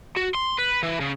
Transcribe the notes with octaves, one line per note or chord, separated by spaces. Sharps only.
F#4
C6
B4
E3
C#3